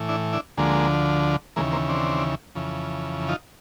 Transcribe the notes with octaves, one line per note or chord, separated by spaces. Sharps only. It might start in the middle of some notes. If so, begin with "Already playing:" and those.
Already playing: A2 E3
D4 E4
D4 E4
D2 D3 F3 G#3 A#3
D#2 C#3 E3 G#3 A#3
A#3 C4
C4 D4
F2 C#3 E3
D#4 F4